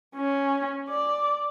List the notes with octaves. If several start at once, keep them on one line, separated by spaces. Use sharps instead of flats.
C#4
D5